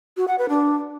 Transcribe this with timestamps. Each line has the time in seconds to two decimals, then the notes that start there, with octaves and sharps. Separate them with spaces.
0.17 F#4
0.28 F#5
0.38 B4
0.49 D4